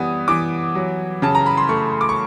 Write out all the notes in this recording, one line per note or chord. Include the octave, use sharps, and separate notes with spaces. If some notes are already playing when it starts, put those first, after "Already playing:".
Already playing: E3 G3 B3 D#6
E3 D6
F#3
C#3 A5
A#5
B5
C6
A3 C#6
D6
C#6